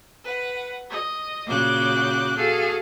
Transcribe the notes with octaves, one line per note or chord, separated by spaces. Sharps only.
B4 F#5
D#5
A#2 C#3 F#4 D6 F#6 G6
F#4 G#4 A4 F5